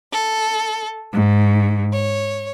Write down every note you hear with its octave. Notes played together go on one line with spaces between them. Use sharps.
A4
G#2
C#5